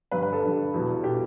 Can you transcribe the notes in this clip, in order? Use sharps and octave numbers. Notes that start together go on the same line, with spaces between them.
G2 D3 G3 B4
B4
A4
G2 D3 G3
E2 B2 G3
B2 G3 G4